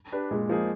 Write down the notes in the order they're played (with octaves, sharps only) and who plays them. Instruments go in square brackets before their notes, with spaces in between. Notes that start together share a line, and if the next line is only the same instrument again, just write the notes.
[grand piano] D4 G4 B4
[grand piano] A#2 [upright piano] G#3
[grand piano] F3 A#3 D#4 G#4